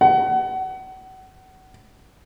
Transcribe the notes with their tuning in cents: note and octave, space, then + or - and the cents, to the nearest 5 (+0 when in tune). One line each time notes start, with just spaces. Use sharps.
F#5 +30